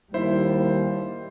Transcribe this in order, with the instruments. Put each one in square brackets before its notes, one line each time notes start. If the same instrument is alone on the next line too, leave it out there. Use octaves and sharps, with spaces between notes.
[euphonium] D#2 [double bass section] G3 [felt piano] E4 [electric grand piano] C5